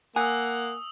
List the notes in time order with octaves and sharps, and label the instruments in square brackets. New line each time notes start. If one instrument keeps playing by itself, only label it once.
[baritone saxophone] A#3 [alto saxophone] F#5 [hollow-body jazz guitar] G#5 [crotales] D#6 E6